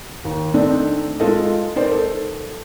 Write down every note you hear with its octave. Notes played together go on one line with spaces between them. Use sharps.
D#2
A3 C4 D4 D#4
G#3 F4 A4 D#5
D#4 A#4 C5 D5
A4